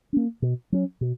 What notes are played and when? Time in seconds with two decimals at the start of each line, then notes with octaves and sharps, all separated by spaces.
0.13 A#3 C#4
0.42 B2
0.72 F#3 C#4
1.01 B2